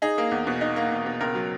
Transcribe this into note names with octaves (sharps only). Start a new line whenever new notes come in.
D#4 G#4
A#3
E2
B2
D#4
A#3
E2
B2
C#2 A#4
F#3